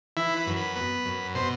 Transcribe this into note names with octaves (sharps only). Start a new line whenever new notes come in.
E3 E4
B4
F#2
B4
B3
F#2
B2 C5